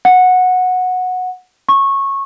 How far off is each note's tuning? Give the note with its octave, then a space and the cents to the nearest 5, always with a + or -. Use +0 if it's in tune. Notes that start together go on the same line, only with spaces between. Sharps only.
F#5 -15
C#6 -15